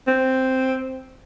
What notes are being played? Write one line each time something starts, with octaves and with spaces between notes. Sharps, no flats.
C4